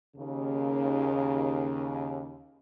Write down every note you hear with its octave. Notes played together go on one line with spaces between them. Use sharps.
D#2 C#3